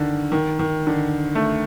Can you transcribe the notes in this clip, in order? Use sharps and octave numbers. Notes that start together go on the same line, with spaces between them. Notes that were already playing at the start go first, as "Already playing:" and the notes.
Already playing: D3 D#3
D#3
D#3
D3
A3